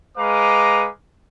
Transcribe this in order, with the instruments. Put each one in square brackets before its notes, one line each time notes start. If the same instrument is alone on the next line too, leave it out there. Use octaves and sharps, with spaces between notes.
[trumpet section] G#3 B4 F5 A#5 D6